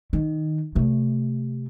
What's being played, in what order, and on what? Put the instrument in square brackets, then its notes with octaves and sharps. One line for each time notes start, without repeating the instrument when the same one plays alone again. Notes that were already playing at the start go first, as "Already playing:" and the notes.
[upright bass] D#3
C3 A3